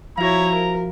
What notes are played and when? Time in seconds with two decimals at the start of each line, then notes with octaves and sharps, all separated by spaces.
0.18 F3 E4 F#4 C#5 F5 A#5
0.55 A#4